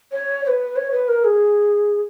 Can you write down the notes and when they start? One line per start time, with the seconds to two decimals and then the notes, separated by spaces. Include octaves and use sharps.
0.12 C#5
0.44 C#5
0.47 B4
0.76 C#5
0.91 B4
1.08 A#4
1.24 G#4